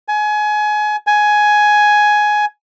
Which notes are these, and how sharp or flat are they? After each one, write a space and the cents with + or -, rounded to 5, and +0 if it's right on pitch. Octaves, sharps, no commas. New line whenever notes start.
G#5 +25
G#5 +10